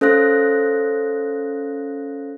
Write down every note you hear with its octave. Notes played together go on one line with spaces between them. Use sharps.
C#4 A4 C5 F5 F#6 A#6